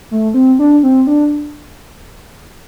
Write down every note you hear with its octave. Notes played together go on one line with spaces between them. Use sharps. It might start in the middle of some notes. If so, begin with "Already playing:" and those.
A3
C4
D4
C4
D4